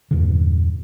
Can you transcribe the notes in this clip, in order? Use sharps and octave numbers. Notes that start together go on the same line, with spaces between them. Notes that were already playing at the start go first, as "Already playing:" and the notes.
E2 G2 A#2 D3